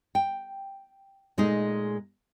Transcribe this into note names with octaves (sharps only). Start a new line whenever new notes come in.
G5
A#2 G#3 A3 D#4 G#4